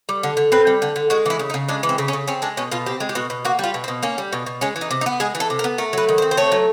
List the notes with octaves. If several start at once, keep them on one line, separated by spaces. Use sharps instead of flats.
G3
D3
D3
C4 B4
G3
D3
D3
G#3 F#4
E3 E4
C#3
D#4
C#3
G#3 D4
E3
C4
C#3
C#4
C#3
C4 C#4
G#3 D4
B2 C#4
B2 F4
C4 G4
G#3
G4
B2 F#4
B2
A#3 F#4
G3 F4
B2
C4
B2
A#3 C#4
G3
B2
B2
G#3 C#4
E3
D#4
C3
D#4
B3
G#3 G#4
E3
A4
C3
A#4
B3
A3 A#4
F#3 B4
D#3
C5
C4
C5
A3 C#5
F#3